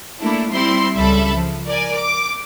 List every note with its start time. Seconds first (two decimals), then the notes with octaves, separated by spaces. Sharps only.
0.21 A3 A#3 D4 E4
0.52 G3 C4 E4 C6
0.97 C#2 G3 A4 E5 A5 B5
1.34 F3
1.65 A#4 D5 G#5
1.95 D6